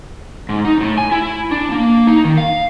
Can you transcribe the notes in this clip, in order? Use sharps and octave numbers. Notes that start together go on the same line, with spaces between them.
G#2
D#4
A2
G#5
E4
D4
A#3
D#4
D#3
F5